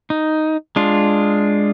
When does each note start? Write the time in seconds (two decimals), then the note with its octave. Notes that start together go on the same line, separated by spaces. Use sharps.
0.10 D#4
0.76 G#3 D4 F4